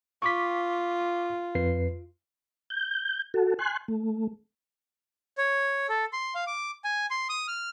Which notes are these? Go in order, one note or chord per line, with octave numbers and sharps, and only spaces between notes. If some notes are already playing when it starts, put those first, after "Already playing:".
F4 C#6 D6 B6
F2 B4 C7
G6
F#4 A4
G#5 C6 F#6
A3
C#5
A4
C6
F5
D6
G#5
C6
D#6
F6